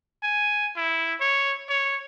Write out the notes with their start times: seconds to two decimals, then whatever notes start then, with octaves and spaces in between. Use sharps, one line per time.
0.23 G#5
0.76 E4
1.20 C#5
1.69 C#5